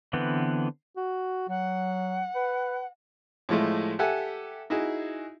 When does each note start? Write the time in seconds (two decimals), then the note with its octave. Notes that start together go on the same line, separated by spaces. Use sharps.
0.13 D3 E3 B3 C4
0.96 F#4
1.48 F#3 F#5
2.35 B4
3.49 A2 F3 G#3 A3
3.99 G4 A4 E5 F#5 G#5
4.70 D#4 E4 F#4 G#4